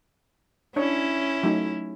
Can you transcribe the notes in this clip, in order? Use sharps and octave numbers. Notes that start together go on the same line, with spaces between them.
C#4 D4 E4 C#5
F#3 A3 D#4